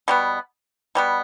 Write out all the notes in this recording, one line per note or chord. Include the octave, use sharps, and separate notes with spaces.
B2 G3 B3
B2 G3 B3